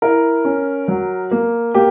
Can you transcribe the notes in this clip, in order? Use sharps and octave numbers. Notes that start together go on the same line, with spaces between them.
E4 A#4
C#4
F#3
A#3
A#3 G4